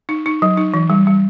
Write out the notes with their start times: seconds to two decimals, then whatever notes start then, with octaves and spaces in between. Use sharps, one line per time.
0.09 D#4
0.26 D#4
0.42 F#3
0.57 D#4
0.74 E3
0.90 G3
1.07 G3